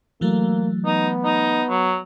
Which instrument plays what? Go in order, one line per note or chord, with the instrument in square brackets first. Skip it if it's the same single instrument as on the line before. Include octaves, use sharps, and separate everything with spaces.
[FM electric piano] E3 F#3 A3 [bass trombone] A#3
[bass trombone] B3 [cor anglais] D#4
[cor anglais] D#4
F#3